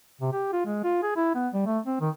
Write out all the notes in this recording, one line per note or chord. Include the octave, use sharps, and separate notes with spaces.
C3
G4
F4
G#3
F4
G#4
E4
B3
G3
A3
C4
D#3